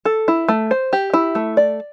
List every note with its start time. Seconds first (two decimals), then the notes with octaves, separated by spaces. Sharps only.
0.05 A4
0.28 E4
0.49 A3
0.71 C5
0.93 G4
1.14 E4
1.35 A3
1.57 D5